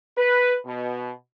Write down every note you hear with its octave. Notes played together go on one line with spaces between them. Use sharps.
B4
B2